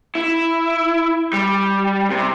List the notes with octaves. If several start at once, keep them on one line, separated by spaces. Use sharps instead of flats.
E4
G3
C3